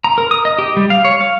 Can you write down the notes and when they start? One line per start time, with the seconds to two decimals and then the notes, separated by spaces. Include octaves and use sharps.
0.04 A#5
0.18 A#4
0.31 D#6
0.45 D#5
0.59 G4
0.77 G3
0.90 F5
1.05 C#5
1.21 F5